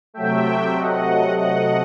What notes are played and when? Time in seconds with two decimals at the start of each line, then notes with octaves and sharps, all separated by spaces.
0.14 C3 F#3 A3 E5 G5
0.76 D#5 F#5
1.37 D#5 F#5